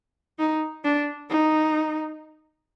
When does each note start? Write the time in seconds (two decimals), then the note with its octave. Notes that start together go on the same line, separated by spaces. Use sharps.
0.39 D#4
0.84 D4
1.30 D#4